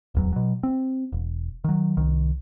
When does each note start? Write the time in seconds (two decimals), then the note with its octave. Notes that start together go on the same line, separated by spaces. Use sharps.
0.15 D1 E2 F#3
0.33 B2 F#3
0.63 C4
1.13 E1
1.64 D#3 F#3
1.97 C2 D#3